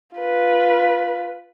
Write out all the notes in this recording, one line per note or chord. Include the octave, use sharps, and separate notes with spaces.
F4 B4